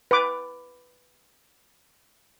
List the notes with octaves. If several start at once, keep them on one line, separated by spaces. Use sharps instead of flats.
B4 D6